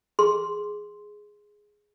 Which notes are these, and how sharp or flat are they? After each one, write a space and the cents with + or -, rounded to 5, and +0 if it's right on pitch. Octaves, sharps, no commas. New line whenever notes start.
G#4 +0 C6 +0